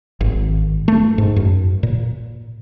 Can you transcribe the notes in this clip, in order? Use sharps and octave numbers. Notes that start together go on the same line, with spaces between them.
G#1
A3
G#2
F#2
A#2